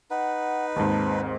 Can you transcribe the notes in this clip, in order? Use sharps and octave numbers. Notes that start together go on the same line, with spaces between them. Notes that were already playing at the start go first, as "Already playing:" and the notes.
D#4 B4 F#5
D#2 G#2 G#3 C4 A5